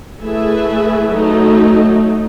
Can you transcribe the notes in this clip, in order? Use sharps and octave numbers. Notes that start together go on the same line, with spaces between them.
A3 E4 G#4 B4 E5
F#3 A3 D#4